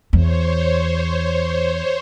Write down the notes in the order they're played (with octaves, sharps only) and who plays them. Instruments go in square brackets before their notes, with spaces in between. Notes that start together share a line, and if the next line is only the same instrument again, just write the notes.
[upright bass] E2 [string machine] C5 C#5